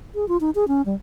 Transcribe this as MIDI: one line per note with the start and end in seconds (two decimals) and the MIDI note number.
0.15 0.28 68
0.28 0.37 65
0.41 0.50 63
0.55 0.68 68
0.68 0.82 61
0.86 0.95 55